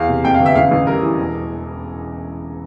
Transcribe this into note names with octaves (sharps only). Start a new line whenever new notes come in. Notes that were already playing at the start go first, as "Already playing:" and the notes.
Already playing: E2 F5
C3
F2 G5
F5
G1
E5
A1 F5
A1
G3 A#4
E3
E1